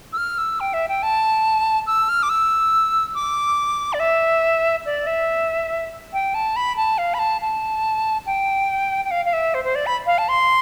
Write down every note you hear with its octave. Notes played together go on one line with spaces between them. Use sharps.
E6
F6
E6
G5
E5
G5
A5
E6
F6
D6
E6
D6
D5
E5
D5
E5
G5
A5
B5
A5
F5
B5
A5
A5
G5
G5
F5
F5
E5
C5
C5
D5
B5
F5
A5
C6